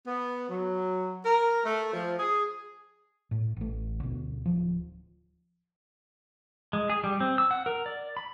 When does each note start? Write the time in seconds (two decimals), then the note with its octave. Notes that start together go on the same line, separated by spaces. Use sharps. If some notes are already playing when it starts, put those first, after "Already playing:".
0.06 B3
0.49 F#3
1.25 A#4
1.65 A3
1.93 F3
2.19 G#4
3.31 A2
3.57 A1 A3
4.00 D2 B2
4.46 D1 F3
6.73 G#3
6.90 G#4
7.04 G3
7.21 C4
7.38 E6
7.51 F#5
7.66 A#4
7.86 D5
8.17 B5